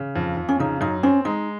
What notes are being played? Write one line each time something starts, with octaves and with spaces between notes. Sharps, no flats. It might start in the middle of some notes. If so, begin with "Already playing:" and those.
Already playing: C#3
F2
F2
C#4
C#3 D#4
F#2 D#4
C4 C#4
G#3 D#4